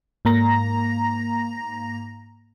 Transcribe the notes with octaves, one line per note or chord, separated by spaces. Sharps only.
G#2 A#3 A#5 A#6